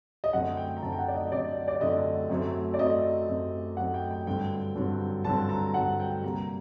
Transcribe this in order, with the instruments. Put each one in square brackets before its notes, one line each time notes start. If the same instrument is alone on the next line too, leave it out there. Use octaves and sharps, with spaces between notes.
[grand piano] D#5
F#2 D3 A3 C4 F#5
G5
A#5
F#2 D3 A3 C4 A5
G5
F#5
D5
D#5
D#5
F#2 D3 A3 C4 D5
D5
F#2 D3 A3 C4 D#5
F#2 F#3 A3 C4
D5
F#2 F#3 A3 C4 D#5
F#2 F#3 A3 C4
F#2 F#3 A3 C4 F#5
G5
G5
G2 D3 F#3 C4 G5
G2 D3 F#3 C4
G2 D3 F#3 C4 A5
A#5
G2 D3 F#3 C4 F#5
G5
C3 G3 A#3 A#5